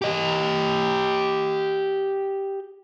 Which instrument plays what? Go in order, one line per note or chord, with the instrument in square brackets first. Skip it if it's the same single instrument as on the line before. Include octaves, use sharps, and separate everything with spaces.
[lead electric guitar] G4 D#5